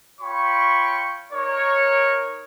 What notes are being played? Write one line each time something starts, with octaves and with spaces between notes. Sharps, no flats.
F4 C#5 G5 B5 C#6
D#4 A#4 C#5